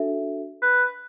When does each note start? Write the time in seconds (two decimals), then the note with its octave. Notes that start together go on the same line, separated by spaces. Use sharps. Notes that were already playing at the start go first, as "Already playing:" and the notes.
Already playing: D4 F#4 A4 E5
0.62 B4